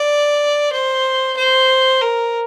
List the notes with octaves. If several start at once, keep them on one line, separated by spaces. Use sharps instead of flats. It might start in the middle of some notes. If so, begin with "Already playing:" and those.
Already playing: D5
C5
C5
A#4